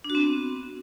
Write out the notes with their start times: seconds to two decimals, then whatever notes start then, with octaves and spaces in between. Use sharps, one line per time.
0.04 D4
0.10 F#4
0.15 C4
0.20 B3